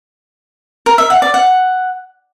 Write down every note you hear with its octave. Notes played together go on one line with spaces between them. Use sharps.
A#4
E5
F#5
D5
F#5